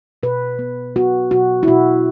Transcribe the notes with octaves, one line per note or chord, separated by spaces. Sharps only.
B2 B4
B3
B3 F#4
B2 F#4
E4
B2 F#4